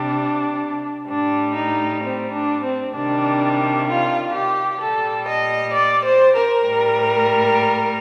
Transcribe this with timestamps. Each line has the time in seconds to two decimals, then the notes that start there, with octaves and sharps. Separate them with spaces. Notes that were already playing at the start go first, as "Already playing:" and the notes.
Already playing: C3 G3 D4
1.08 A2 G3 D4
1.54 D#4
2.02 C4
2.32 D4
2.63 C4
2.94 C3 D#3 G3 D4
3.87 F4
4.33 G4
4.80 A#2 G3 A4
5.26 D#5
5.73 D5
6.03 C5
6.35 A#4
6.66 A2 G3